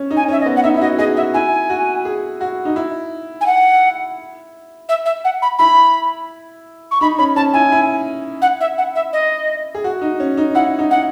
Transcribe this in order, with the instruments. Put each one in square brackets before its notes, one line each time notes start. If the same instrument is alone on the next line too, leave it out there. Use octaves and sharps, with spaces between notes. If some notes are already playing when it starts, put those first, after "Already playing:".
Already playing: [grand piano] C#4
D#4
[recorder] G#5
[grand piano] C#4 [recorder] E5
[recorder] D#5
[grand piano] B3
[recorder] F#5
[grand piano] D#4 [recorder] E5
[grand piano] E4
[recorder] E5
[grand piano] F#4 [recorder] D#5
[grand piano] G#4 [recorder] D#5
[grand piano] F#4 [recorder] E5
[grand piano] E4 [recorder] G#5
[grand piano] F#4
G#4
F#4
D#4
E4
[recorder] G#5
F#5
E5
E5
F#5
B5
[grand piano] E4 [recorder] B5
[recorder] C#6
[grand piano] D#4 [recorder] B5
[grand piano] C#4 [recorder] B5
[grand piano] C#4 [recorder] A5
[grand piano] E4 [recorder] G#5
[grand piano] E4
[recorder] F#5
E5
F#5
E5
D#5
[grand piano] G#4
F#4
D#4
C#4
D#4
[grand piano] E4 [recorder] F#5
[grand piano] D#4
[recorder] F#5